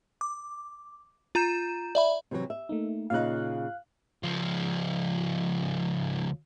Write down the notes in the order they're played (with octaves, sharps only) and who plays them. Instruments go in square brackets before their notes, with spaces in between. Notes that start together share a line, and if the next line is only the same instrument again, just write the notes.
[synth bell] D6
F4 A#5 G6 E7
D5 E5 B5
[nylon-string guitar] C3 E3 F#3
E5
[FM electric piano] A3 A#3 D#4
[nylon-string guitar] A#2 C#3 D#4 [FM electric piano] F5 F#6
[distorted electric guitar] C#2 F3